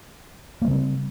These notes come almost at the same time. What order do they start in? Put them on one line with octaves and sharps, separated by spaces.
A#3 G3 C#3 C4